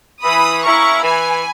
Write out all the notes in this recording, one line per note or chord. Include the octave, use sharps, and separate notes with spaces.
E3 B5 D#6
A#3 C#4 E4 A#5 C#6
E3 G#5 B5